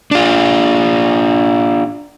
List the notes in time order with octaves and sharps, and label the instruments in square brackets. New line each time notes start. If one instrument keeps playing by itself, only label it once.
[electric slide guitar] D4 F4